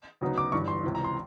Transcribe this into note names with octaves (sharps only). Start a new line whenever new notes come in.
D2 C#3 F#3 B3 D#4
D6
G1 G2 E3 C#6
C6
C#2 C3 E3
A#5
C6